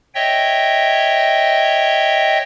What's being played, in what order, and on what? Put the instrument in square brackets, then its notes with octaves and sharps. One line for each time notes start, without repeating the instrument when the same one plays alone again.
[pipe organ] C#5 D#5 E5 G5